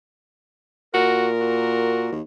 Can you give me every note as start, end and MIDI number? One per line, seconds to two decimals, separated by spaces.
0.94 2.11 46
0.94 1.28 66
0.94 2.17 70
1.40 2.19 66
2.12 2.21 39